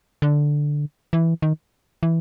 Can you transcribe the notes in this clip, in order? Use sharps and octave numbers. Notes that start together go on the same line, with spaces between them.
D3
E3
D#3
E3